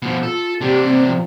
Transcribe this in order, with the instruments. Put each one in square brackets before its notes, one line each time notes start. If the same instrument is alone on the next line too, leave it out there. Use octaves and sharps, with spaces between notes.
[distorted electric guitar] B2 F3
[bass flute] F4 [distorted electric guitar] A4
[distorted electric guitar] C3 D4 [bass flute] G4
[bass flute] C4
F3